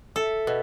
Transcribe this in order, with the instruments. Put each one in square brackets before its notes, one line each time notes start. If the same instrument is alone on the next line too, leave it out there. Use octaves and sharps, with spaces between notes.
[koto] A4 [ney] E5
[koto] B2